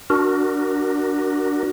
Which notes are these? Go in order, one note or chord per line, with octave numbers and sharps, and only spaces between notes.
D4 F#4 A#4